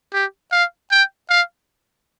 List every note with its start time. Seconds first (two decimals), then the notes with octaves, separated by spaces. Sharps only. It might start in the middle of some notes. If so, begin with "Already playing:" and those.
0.13 G4
0.52 F5
0.91 G5
1.30 F5